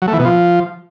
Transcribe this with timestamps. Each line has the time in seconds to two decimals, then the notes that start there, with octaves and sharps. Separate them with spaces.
0.02 F#3
0.08 A3
0.13 E3
0.19 B2
0.25 F3